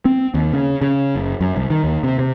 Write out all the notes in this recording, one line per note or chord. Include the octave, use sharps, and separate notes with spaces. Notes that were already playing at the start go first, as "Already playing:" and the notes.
C4
D#2
C#3
C#3
F#1
F#2
C2
D#3
D#2
C3
C3